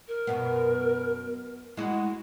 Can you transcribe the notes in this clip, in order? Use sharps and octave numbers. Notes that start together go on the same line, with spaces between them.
A#4
F#2 B2 B3
G#3 E4 F#4